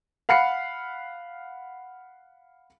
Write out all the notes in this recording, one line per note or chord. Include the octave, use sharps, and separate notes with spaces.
F5 F#5 B5 C7 C#7